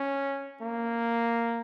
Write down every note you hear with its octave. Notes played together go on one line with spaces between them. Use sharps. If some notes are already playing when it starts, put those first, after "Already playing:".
Already playing: C#4
A#3